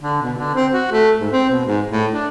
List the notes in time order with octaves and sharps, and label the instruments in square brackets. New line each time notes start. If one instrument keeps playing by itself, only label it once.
[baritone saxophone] D3
B2
D3
C4
F#4
A3
G#2
C4
B2
G#2
A2
D4